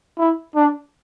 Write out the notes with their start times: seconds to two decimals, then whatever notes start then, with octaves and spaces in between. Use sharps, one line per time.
0.18 E4
0.56 D4